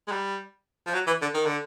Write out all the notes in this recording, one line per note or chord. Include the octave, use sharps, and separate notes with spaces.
G#3
G3
F3
F#3
E3
D3
D#3
D3